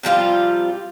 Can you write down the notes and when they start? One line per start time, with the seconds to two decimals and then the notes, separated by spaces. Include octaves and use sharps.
0.03 C3 F3 G3 F4